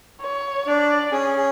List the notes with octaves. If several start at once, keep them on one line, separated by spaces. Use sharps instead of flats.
C#5
D4 D5
C#4 G#4